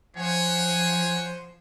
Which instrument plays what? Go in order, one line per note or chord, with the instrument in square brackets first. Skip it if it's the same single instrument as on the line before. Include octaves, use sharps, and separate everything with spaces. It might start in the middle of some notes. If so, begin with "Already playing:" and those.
[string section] F3 [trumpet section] C5 F#5 [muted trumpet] C#5 [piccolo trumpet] G#5